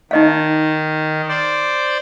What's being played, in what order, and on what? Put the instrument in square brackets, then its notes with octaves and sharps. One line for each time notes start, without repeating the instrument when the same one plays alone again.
[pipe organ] D#3 [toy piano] D#4 D#5 F5
[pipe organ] C5 D5